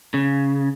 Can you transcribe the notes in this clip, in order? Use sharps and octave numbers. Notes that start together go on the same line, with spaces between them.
C#3